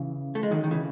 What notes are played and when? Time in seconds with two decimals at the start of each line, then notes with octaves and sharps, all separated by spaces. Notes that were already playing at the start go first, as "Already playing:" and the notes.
Already playing: C#3 E3
0.35 A3
0.43 G#3
0.51 D#3 F#3
0.64 D#3
0.71 C#3 E3